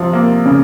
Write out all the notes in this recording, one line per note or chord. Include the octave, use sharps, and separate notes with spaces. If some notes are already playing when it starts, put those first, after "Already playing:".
Already playing: C3 F3
A#3
C#3